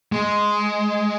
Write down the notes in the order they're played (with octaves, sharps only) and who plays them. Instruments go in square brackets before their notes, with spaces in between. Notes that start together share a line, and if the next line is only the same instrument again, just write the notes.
[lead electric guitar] G#3